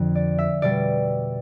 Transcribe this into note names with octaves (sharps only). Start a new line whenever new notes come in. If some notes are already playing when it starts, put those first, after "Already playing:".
Already playing: F2 D3 F3
D5
E5
B2 G3 D5